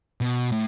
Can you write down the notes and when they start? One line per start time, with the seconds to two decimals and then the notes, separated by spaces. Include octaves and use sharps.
0.21 B2
0.52 A2